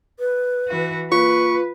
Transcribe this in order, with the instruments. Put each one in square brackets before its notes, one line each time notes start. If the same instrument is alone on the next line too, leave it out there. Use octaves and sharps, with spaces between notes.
[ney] B4
[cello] E3 F#4
[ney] A#3 [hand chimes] F4 [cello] B4 [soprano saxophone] C#6